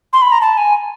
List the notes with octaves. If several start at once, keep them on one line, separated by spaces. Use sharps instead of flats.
C6
B5
A#5
A5
G#5